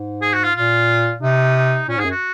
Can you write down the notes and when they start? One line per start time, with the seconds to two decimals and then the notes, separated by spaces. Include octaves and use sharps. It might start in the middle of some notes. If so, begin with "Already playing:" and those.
Already playing: G#2
0.22 G#4
0.33 F#4
0.44 F4
0.55 A#2 F4
1.22 C3 D#4
1.56 D#4
1.88 A#2 C#4
1.97 G#2 G#4
2.05 F#2
2.11 F#4